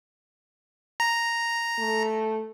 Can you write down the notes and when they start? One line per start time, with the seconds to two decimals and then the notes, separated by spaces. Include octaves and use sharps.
1.00 A#5
1.79 A3